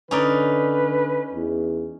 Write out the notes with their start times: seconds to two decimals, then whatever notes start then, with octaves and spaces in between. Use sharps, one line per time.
0.11 D3 C#4 D#4 B4 D5
1.34 E2